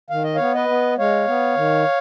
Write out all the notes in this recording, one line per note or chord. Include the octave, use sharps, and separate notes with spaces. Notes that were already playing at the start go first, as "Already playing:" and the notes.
D#3 F5
D#5
B3 C#5 F5
B4 D#5
B3
G#3 C#5 F5
B3
D#3